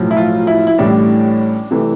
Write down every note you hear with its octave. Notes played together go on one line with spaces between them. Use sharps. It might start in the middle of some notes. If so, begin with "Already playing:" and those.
Already playing: B1 A2 F3
E4
F4
E4
E4
A1 A2 G3 D4
C3 E3 A3